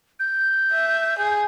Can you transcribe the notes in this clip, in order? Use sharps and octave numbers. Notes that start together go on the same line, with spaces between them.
G6
E5
G#4